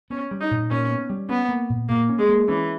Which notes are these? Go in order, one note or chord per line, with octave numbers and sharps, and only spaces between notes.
B3 C#4
G3
D#4
A#2
A#2 C#4
B3
G3
B3 C#4
A#3
A#2
A#2 A#3
C#4
G#3
A#3
E3 C#4